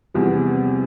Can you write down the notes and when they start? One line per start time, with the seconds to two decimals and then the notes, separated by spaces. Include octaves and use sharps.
0.14 E2 C3 F3 G3
0.35 B3
0.55 C4